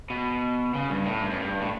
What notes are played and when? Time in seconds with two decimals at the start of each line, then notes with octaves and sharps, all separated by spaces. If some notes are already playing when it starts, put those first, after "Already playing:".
0.10 B2
0.74 C#3
0.90 G2
1.06 A2
1.21 G2
1.31 F#2
1.40 G2
1.61 A2